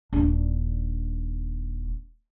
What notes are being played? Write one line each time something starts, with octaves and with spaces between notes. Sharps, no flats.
D#1 D4